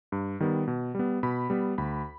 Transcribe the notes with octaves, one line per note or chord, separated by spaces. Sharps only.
G2
D#3 G3 B3
B2
G3 B3
B2 B5
G3 B3
D2 B5